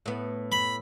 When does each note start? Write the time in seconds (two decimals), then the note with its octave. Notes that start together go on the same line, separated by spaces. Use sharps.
0.06 A2 B3
0.52 B5